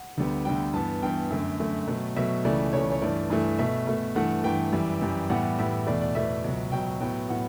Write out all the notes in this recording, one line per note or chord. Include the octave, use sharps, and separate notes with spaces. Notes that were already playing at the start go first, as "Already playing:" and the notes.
Already playing: F#5
D2 D3 G3 B3
D2 D3 G3 B3 G5
G2 E3 B3 A5
G2 E3 B3 G5
F#2 D3 A3
F#2 D3 A3
B2 F#3 A3
B2 F#3 A3 E5
C#2 C#3 E3 A3 D5
C#2 C#3 E3 A3 C#5
C#5
G2 E3 A3 D5
G2 E3 A3
B2 A3 E5
B2 A3
G2 E3 A3 F#5
G2 E3 A3 G5
F#2 E3 G3
F#2 E3 G3
A2 E3 G3 B3 F#5
A2 E3 G3 B3 E5
E2 B2 A3 D5
D5
E2 B2 A3 E5
C#2 B2 F#3
C#2 B2 F#3 G5
A2 F#3 B3 G5
A2 F#3 B3 F#5